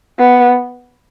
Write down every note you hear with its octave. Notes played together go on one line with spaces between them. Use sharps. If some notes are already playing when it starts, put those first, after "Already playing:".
B3